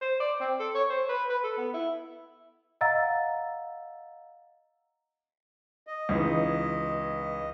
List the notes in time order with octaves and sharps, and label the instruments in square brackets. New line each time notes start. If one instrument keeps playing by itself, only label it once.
[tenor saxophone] C5
D5
C4
A4
C#5
C5
B4
B4
A4
B3
E4
[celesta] D#5 F5 F#5 A#5 E6 A6
[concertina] D#5
[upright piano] C#2 E3 D#4